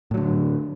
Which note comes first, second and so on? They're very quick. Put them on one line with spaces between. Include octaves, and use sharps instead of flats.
A2 F#3 D3